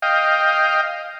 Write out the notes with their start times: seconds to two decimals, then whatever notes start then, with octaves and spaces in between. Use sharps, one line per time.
0.02 D#5 F5 G5